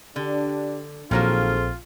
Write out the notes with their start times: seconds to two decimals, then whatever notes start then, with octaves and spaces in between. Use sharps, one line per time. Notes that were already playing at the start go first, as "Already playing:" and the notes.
0.16 D3 D4 G4
1.11 A#1 D#3 F#3 A#3 C4 F4 G#4 A4